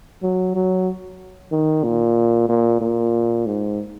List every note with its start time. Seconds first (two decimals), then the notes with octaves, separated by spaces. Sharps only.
0.22 F#3
0.55 F#3
1.51 D#3
1.84 A#2
2.48 A#2
2.81 A#2
3.46 G#2